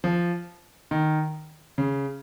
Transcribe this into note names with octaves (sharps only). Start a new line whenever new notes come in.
F3
D#3
C#3